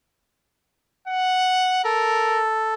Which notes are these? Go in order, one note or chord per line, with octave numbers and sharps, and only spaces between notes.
F#5
A4 A#4